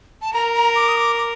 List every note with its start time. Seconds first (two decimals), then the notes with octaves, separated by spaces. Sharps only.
0.22 A5
0.34 A#4 A#5
0.55 A#5
0.76 D6
0.88 D#6
0.97 D6
1.18 D6